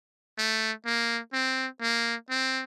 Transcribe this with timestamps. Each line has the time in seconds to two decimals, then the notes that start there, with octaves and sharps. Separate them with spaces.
0.38 A3
0.86 A#3
1.33 C4
1.82 A#3
2.30 C4